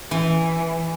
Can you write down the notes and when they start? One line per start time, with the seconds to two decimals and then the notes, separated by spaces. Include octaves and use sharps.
0.11 E3